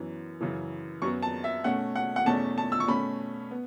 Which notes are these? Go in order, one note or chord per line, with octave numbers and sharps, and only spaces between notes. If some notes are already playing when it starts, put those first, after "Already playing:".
Already playing: F#2 E3 B3
F#2 C#3 E3
F#2 F#3 B3 C#6
A5
E5
B2 A3 C#4 F#5
F#5
F#5
E2 B2 A3 C#4 A5
A5
E6
C#6
B2 A3 C#4 B5
B3